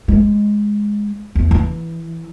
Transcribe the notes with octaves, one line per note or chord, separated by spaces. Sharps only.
G#3
E2
E3